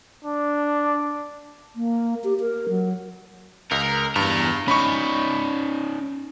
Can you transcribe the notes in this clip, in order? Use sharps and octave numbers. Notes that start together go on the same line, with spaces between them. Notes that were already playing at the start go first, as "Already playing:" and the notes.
D4
A#3
G4
A#4
F#3
C#2 A#4
E2 G2 A#5
C#4 D#4 B5 C#6